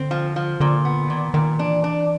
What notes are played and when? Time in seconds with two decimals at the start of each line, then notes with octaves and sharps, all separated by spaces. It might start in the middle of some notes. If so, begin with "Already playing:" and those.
Already playing: D3 C4
0.11 F3
0.36 F3
0.60 A#2 D3
0.85 B3
1.10 A#2 D#3
1.34 A#2 D#3
1.59 E3 D4
1.84 D4